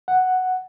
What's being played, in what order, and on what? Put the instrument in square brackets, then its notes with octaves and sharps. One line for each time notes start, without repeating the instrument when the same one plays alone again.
[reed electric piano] F#5